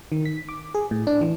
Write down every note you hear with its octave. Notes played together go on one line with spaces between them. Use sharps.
D#3
B6
D6
G#4
A2
D4
E3